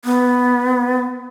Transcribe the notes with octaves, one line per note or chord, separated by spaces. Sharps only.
B3